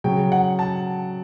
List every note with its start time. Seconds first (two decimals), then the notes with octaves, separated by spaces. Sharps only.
0.04 C#3 F#3 G5
0.32 F#5
0.59 A5